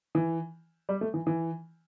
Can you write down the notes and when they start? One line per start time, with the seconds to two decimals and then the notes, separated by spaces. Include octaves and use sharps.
0.15 E3
0.89 G3
1.01 A3
1.14 E3
1.27 E3